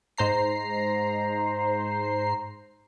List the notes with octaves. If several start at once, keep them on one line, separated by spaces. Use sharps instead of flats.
G#2 C5 A#5 C7